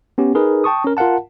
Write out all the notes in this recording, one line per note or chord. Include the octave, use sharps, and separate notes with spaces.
B3 C#4 G4
D#4 G#4 A#4 B4
G5 A5 C#6 D#6
C#4 A#4
F4 A#4 F5 F#5 A5